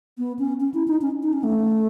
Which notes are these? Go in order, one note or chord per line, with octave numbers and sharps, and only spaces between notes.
B3
C#4
C#4
E4
D#4
C#4
D#4
C#4
A3